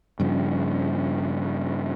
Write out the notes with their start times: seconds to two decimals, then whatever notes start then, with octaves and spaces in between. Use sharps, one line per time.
0.20 G2 C#3 F3